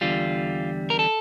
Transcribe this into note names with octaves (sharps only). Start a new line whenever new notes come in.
E2 D3 G3 F4
A#4
A4